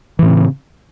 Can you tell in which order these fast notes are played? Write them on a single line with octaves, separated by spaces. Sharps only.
E3 A2 C4 C#3